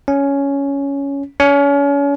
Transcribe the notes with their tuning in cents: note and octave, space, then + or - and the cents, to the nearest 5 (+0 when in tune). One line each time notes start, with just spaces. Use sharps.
C#4 +10
C#4 +35